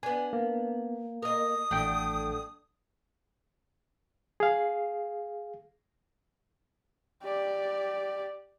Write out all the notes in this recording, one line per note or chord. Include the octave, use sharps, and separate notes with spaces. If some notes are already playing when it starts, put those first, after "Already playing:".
B3 D4 G#5
A#3
A#4 D#5 D#6
A1 F#3 A3 D4 G5
G#4 F5
G4 D5